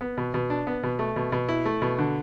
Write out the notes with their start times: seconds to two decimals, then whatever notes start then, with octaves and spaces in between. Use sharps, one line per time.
0.01 B3
0.17 B2
0.34 B2
0.50 D4
0.67 B3
0.83 B2
0.99 A3
1.16 B2
1.32 B2
1.49 E4
1.66 A3
1.82 B2
1.98 D3